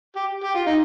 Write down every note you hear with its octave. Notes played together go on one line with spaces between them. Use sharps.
G4
G4
F4
D#4